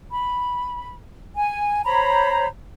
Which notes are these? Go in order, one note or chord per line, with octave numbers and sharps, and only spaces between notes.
B5
G#5
C5 C#5 A#5 B5